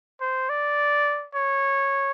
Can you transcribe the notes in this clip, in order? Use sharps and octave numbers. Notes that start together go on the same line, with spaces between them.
C5
D5
C#5